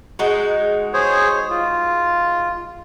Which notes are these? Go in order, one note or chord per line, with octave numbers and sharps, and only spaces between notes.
G#3 D#4 F#4
G#4 C5 C#5
F4